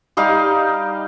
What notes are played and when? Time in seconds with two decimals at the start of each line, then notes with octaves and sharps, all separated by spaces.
0.17 G3 D#4 G4 F5